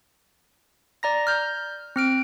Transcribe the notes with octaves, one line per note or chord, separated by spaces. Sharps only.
D5 A#5 A#6
F6 G6
C4 F6 D7